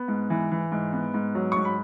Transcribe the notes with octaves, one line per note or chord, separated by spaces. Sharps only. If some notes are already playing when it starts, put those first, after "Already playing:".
Already playing: B3
G#2
E3
E3
G#2
B3
G#2
F#3
G#2 C#6
B5